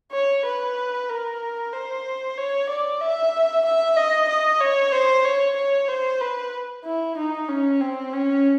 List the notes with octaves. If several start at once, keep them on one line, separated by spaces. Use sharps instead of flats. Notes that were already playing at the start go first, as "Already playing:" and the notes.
C#5
B4
A#4
C5
C#5
D5
E5
E5
D#5
D#5
C#5
C5
C#5
C#5
C5
B4
E4
D#4
C#4
C4
C#4